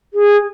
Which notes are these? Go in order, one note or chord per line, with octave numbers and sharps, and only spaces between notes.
G#4